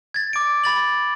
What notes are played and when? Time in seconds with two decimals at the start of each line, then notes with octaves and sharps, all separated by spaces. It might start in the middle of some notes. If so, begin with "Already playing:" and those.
0.14 G#6 A6
0.33 D6 D7
0.64 B5 A6 F#7